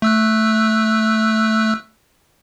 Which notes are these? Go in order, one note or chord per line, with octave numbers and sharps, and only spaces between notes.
A3 E6 F#6